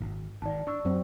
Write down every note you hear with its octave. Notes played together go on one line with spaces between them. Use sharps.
G#1
G#1 D#3 D5 A5
D4 D5 C#6 E6
F#2 F#3 C4